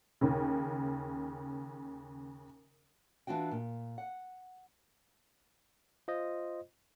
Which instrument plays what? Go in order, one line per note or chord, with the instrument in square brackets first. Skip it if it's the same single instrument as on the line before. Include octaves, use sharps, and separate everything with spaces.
[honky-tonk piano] D#2 C#3
[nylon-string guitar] E3 D4 F4 F#4 G5
A#2
F#5
[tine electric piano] F4 C5 D#5